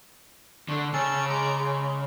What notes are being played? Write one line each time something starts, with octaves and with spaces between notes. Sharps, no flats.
D3 A3
C#3 C#4 A5 E6
G#3 A#5 D6
G#3